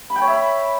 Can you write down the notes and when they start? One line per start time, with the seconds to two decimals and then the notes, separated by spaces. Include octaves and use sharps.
0.10 B5
0.16 G5
0.22 C#5
0.27 E5
0.33 B5